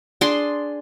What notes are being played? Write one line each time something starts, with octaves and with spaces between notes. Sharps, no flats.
D4 G#4 C6